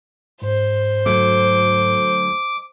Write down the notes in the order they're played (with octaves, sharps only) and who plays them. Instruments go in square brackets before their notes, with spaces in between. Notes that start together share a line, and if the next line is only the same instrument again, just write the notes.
[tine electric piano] G#2 [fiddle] C5
[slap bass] D2 F#3 A3 [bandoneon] D6